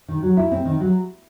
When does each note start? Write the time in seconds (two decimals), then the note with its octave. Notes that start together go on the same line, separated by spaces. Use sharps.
0.08 D#3
0.22 F#3
0.37 E4
0.52 C4
0.65 D#3
0.80 F#3